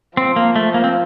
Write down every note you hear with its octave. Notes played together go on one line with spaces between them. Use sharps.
F3 C4
A#3
A3
A#3
C4